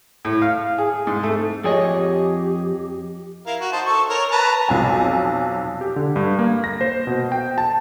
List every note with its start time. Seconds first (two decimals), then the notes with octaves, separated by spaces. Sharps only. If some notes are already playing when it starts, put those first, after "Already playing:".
0.25 A2
0.42 F5
0.78 G#4
1.07 G#2
1.23 A3
1.64 F2 G4 G#4 C#5 D#5 G#5
3.46 E4 A#4 F5
3.60 F#4
3.72 D#4 C5 A5
3.86 A4 C#6
4.09 A#4 C#5
4.31 B4 A5 A#5
4.69 B1 F2 G#5
5.81 G4
5.96 D3
6.16 G2
6.39 A#3
6.64 A#6
6.81 C5
7.07 B2
7.32 G5
7.58 A5